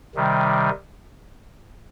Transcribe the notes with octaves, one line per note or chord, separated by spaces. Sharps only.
C3 D#3 G3